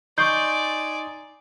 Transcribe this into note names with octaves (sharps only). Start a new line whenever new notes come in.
D#4 D5 G#5 C6 C#6 D#6 G6